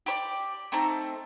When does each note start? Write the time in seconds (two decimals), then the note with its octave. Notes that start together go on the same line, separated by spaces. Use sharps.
0.06 G4 C5 D5
0.72 A3 C4 D#4 A5